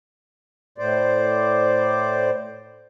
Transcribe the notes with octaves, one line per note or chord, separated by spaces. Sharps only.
A2 C5 D5